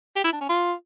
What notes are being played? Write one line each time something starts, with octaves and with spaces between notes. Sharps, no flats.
G4
E4
D4
C#4
F4